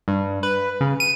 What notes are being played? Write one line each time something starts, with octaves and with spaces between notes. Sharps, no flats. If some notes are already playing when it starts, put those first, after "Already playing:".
G2
B4
C#3
D#7